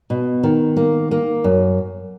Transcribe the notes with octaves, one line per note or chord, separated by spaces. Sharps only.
B2
D#3
A#3
A#3
F#2